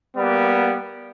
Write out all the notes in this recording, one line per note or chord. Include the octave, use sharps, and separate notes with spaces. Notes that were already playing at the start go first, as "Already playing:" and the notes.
G3 A#3 B3